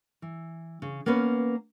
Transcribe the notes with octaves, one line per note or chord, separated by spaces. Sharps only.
E3
C#3
A#3 B3 C#4 B4